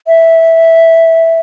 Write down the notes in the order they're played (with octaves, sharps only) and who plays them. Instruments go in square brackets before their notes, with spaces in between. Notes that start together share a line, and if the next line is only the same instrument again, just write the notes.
[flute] E5